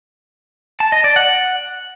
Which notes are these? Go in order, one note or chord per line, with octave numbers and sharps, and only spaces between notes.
A5
D#5
D5
F#5